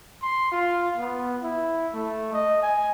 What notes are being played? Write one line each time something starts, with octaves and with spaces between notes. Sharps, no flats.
C6
F4
B3
E4
A3
D#5
G#5